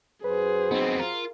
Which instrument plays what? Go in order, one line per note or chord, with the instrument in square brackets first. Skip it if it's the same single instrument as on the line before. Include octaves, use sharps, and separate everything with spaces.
[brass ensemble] F#2 F#4 C5 [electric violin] G#4 [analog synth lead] B4
[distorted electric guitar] B3 C4 [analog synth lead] D#4
[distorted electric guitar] F4 [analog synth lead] A#4